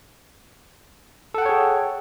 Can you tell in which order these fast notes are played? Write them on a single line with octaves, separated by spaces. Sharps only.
A4 F#5 G5 C#5 G#4